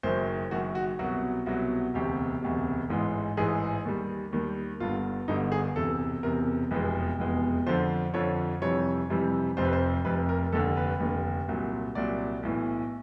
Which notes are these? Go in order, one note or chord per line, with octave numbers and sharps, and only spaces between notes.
F#1 F#2 D#3 C5
F#1 F#2 D#3 F#4
F#4
C2 B2 F#3 F#4
C2 B2 F#3 F#4
E1 D2 C3 G4
E1 D2 C3
A1 G#2 E3 G#3
A1 G#2 E3 G#3 G#4
D#2 D#3 G3
D#2 D#3 G3
G1 G2 D3 F4
G1 G2 D3 D#4
G#4
E1 E2 C3 A4
E1 E2 C3 A#4
F1 E2 B2 G#3 B4
F1 E2 B2 G#3
F2 D3 F3 C5
F2 D3 F3 C#5
F2 C3 E3 G3 C#5
F2 C3 E3 G3
F1 F2 C3 C5
B4
C5
F1 F2 C3 B4
A#4
F1 D#2 D3 A4
B4
F1 D#2 D3
C2 A#2 F#3
C2 A#2 F#3 D5
B1 A2 E3